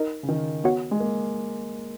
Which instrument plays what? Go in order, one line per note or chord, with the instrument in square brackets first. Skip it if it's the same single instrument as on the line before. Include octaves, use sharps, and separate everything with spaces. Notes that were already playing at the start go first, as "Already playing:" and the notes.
Already playing: [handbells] D#4 A#4 D#5
[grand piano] C#3
D#3
[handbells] B3 F#4 C#5 F#5
[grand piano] G#3
A#3